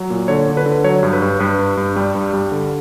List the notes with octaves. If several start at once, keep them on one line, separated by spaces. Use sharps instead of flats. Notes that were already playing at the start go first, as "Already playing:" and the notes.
Already playing: F#3
A#2
D3 C#5
D3
B4
D3
F#3 C#5
G2
B4
G2
G2 B4
G2
G2
G3
G2
G3
D3